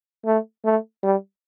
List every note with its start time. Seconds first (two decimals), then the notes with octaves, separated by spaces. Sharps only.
0.26 A3
0.65 A3
1.03 G3